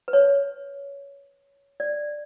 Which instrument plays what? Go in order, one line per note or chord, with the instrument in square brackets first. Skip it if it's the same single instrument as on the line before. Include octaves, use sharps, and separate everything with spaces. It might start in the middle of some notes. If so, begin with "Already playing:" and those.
[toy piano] B4
C#5
D5